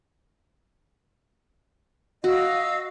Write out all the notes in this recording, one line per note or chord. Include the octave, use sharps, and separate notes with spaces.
F#4 D#5 F5 E6